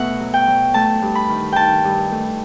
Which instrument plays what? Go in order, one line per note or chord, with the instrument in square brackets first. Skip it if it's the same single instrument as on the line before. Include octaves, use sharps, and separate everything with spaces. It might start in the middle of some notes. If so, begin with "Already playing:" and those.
Already playing: [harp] B2 A3 E5 F#5
F#3
G5
F#3
A3 A5
G2
B5
D#3
D#3 G5 A5
G2
A3